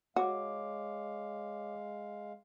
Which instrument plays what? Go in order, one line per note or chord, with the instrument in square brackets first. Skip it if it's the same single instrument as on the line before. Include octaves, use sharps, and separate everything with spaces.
[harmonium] G#3 F5 [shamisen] F#4 [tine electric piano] C#5 D6